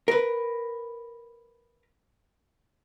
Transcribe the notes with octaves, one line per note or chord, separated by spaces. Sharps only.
A#4 B4